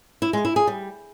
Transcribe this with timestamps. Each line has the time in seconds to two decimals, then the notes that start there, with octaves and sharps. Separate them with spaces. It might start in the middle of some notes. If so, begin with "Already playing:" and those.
0.22 E4
0.33 G#3
0.45 E4
0.56 G#4
0.67 G3